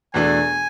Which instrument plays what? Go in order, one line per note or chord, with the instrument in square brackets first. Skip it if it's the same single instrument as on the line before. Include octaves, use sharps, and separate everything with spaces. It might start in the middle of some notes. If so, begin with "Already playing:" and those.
[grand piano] E2 B2 A3 D4 [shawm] G#5